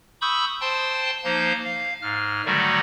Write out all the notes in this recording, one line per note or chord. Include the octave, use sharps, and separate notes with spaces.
B5 C#6 D#6 E6 G6
C5 G5 A5 C6
F3 A#3 D#4 C5 G6
F5
G#2 F6
D3 D#3 F#3 G3 A3 F#4